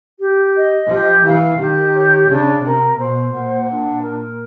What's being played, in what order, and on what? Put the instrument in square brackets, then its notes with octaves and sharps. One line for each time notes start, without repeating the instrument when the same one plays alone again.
[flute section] G4
D#5
[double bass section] F3 [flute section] G4
[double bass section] E3 [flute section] F5
[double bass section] D#3 [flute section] G4
[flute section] C#5
[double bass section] C#3 [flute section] D4
[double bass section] C3 [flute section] A#4
[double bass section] B2 [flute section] C5
[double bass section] A#2 [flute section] F#5
[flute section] D4
A#4